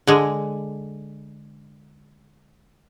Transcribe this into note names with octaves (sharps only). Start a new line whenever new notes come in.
D3 G#3